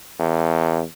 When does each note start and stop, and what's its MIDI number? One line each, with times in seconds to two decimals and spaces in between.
0.19 0.83 40